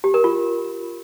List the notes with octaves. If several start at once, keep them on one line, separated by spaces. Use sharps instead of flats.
G4
A#4
F4